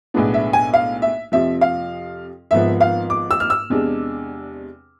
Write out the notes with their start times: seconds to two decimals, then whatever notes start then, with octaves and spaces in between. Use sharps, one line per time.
0.14 B1 A2 G#3 B3 D4
0.34 E5
0.53 G#5
0.74 F5
1.02 E5
1.32 F2 C3 F3 E5
1.61 F5
2.51 G#1 G#2 F3 B3 E5
2.81 F5
3.10 D6
3.31 E6
3.40 F6
3.50 E6
3.70 E2 C3 G#3 D4